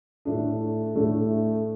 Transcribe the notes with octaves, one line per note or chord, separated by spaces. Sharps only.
A2 A3 D4
A2 A3 D4